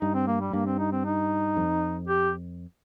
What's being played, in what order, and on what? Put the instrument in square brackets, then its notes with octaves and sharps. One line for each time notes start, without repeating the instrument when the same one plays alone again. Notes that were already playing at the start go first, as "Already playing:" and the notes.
[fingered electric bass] G2 [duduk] D#4
[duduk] C4
A#3
G3
[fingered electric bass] G2 [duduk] A#3
[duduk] C4
D#4
C4
D#4
[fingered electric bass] F2
[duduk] G4